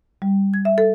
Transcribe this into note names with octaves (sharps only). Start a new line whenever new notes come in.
G3
G#6
E5
A4